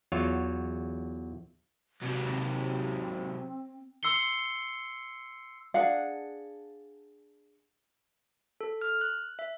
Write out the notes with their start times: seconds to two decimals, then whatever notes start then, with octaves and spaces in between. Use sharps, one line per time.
0.12 E2 F#3 F4 C#5
2.02 C3 F#3
2.23 C4
4.03 C6 E6 C7 C#7 G7
5.74 D4 G#4 F5 F#5
8.61 A4
8.82 F6
9.01 F#6
9.39 E5